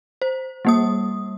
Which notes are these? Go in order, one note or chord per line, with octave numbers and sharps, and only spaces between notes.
C5
G3 A#3 D#6